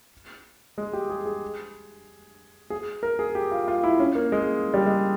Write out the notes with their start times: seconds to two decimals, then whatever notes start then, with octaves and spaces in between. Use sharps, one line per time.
0.78 G#3
0.93 G4
1.10 G#4
1.26 G#4
2.70 G#4
3.03 A#4
3.19 G#4
3.35 G4
3.52 F4
3.68 F4
3.84 E4
4.00 C#4
4.15 A#3
4.32 G#3
4.74 G3
4.86 G#3